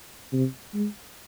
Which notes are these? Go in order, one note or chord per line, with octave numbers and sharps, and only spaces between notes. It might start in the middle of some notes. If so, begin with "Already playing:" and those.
C3
G#3